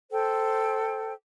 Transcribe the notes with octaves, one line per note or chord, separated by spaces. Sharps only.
A4 C5 G5